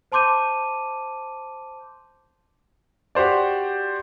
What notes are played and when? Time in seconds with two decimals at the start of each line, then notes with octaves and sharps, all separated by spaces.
0.12 C5 A5 C6 D6 G6 D#7
3.15 F#4 G4 C5 D5